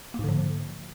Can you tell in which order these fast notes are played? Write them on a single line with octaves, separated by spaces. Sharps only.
A#3 G#2 D3 F3